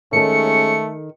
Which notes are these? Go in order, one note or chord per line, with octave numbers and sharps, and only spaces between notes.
D#2 D#3 G#3 A3 C#4 A4 C#7